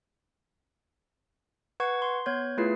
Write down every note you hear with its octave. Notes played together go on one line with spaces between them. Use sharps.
B4 F#5 C#6 G#6
C6
B3 C#5 G6 G#6
A3 E4 F4 G#4 B4 C7